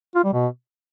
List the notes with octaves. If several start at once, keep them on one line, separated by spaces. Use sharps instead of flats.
F4
G3
B2